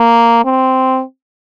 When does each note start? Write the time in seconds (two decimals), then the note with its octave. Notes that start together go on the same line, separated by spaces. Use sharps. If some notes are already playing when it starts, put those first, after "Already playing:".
Already playing: A#3
0.45 C4